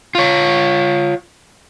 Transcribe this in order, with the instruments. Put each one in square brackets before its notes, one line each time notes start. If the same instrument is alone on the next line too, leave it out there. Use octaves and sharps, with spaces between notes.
[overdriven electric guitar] F4 C#5